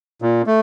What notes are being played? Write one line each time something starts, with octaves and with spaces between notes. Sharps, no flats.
A#2
A3